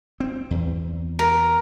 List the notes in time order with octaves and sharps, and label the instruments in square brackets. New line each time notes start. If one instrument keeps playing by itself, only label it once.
[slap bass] C4
E2
[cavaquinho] A#4